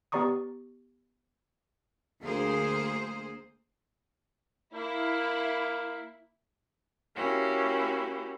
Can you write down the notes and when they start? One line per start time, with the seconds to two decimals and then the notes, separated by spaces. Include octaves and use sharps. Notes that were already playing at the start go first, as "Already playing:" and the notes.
0.12 B3 G4 D5 A#5 C#6 D#6
2.22 D2 A#3 G#4 C5
4.74 A#3 E4
7.15 A#3 C#4 E4 F#4 G4